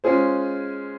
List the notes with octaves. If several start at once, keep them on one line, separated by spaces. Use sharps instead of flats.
G#3 C#4 F4 G#4 C5